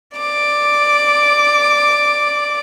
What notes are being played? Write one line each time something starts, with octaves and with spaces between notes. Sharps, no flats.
D5 D6